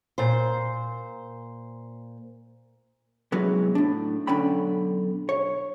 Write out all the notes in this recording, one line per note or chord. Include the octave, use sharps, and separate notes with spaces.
A#2 C5
C3 E3 F#3 G#3 B3 C#4
A2 D4
B1 D3 C#4 D5 G5 B5
C#5